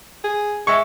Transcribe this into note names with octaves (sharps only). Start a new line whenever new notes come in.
G#4
G#3 E5 C#6